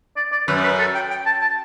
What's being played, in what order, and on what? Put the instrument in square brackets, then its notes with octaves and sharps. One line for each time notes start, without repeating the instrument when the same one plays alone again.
[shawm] D5
D5
[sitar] F#2 [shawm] B4
[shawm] B4
A4
G5
G5
A5
A5